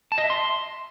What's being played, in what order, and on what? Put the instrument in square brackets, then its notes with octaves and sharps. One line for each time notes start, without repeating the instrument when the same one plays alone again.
[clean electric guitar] A5
D#5
E5
C6